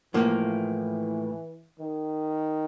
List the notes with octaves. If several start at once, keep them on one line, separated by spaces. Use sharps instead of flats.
A2 E3 F3 A#3
D#3